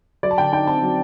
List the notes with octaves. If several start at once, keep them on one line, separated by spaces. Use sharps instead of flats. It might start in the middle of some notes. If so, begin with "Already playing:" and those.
F#3 D5
A5
D3 G5
D#4 G5
C4 A5
F#3